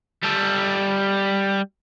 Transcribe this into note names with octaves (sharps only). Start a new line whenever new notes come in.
G3 A4